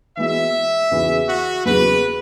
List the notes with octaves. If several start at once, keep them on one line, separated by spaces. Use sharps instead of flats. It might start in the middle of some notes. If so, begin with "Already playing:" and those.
E3 G#3 B3 F#4 E5
E2 C#3 E3 B3 F#4
F#4
E2 C#3 F#3 B4